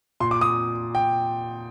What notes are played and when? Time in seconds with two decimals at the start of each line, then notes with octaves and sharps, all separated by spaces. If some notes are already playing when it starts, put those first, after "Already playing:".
0.20 A#2 C6
0.31 D6
0.41 D#6
0.95 G5